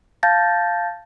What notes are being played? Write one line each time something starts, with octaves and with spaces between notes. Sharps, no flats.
F5 A5 G6 A6 A#6